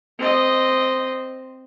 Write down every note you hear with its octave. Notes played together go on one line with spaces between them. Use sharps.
C4 D#5